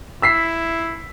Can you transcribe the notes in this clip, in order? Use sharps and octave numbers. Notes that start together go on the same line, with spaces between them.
E4 E6 B6 C7